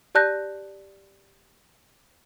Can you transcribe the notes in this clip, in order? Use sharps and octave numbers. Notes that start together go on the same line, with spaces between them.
G4 D5 A5 F#6 G6 A#6